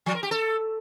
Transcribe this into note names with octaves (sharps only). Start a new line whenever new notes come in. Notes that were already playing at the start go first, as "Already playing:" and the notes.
F3
A#4
G4
A4